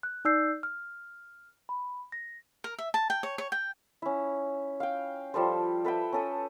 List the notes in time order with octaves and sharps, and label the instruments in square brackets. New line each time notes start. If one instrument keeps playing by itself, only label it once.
[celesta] F#6
D#4 D5 E6 G6 C7
F6
B5
A#6
[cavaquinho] A#4
E5
A5
G5
C#5
C#5
G5
[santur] C#4 E4
F5 G5
F3 G3 A4 C5
A4 B4 E5 G5
C#4 A4 D#6